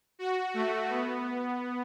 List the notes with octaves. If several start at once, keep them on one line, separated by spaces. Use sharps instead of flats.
F#4
A3
B3